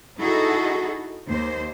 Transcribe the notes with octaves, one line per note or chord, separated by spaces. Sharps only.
D#4 E4 F#4 G#4 A4
D#2 A#3 C5